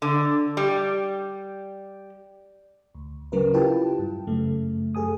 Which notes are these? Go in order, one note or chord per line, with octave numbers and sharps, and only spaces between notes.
D3
G3
D2
C#3 F#3 C#4 A#4 B4
E4 F4 G4 B4 G5 A5
G2
F#2 C#3 A3
F#2 G#4 A4 G#5 D#6